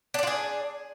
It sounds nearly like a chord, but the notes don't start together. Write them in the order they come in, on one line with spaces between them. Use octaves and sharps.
D4 D5 F4 G#4